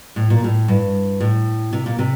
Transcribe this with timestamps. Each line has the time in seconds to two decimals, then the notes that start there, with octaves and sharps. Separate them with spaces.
0.16 A2
0.30 A#2
0.44 A2
0.68 G2
1.20 A2
1.73 C3
1.86 A#2
1.99 C3